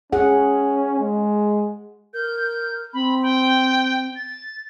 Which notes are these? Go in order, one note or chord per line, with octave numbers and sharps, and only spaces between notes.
C#4 G#4 F#5
G#3
A#4 G6
C4 B5
G5
A6